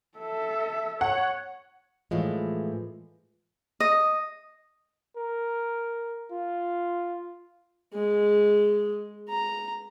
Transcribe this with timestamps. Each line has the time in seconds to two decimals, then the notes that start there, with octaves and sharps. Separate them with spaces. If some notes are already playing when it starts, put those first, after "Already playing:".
0.18 A4 E5
1.01 C#5 F#5
2.11 A2 E3 F3 G#3
3.80 D#5
5.17 A#4
6.31 F4
7.94 G#3
9.29 A#5